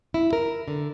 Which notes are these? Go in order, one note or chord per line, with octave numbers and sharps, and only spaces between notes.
E4
A#4
D3